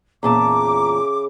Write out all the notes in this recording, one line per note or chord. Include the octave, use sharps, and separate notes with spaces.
E2 A#2 C#3 E5 A5 A#5 D6